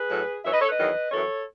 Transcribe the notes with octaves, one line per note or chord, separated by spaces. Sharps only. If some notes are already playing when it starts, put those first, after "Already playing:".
Already playing: G#4 B4
A2 F#3
F#2 E3 C#5 E5
B4 D#5
A4 C#5
B4 D#5
E2 D#3 F#3
F#2 E3 A4 C#5